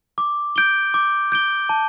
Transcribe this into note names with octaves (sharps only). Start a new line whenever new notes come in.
D6
G6 D7 G7
D6
G6 D7 G7
A5